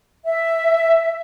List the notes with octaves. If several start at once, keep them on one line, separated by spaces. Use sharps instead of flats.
E5